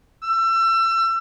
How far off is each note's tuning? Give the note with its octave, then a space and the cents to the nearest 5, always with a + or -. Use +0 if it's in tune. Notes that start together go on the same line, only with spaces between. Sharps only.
E6 +30